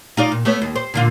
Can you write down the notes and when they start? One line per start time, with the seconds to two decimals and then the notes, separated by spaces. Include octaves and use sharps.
0.17 D#4 F4 D5
0.32 A#2
0.45 A3 B3 C#5
0.62 D#2
0.76 C5
0.94 A#2 D3 F4